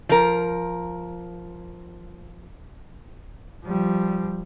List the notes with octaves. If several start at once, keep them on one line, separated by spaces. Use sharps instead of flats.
F3 A#4
F3 G3